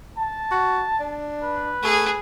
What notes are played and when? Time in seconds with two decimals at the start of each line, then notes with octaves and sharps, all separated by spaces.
0.18 A5
0.51 F#4
1.00 D4
1.43 B4
1.83 A3 G#4